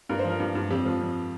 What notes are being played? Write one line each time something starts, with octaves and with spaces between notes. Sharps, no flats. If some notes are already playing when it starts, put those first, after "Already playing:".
G2 A#4
C5
F3 A#4
G2
G2
F2 G4
F3
F2